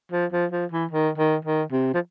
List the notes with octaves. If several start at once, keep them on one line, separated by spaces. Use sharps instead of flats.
F3
F3
F3
E3
D#3
D#3
D#3
C3
F3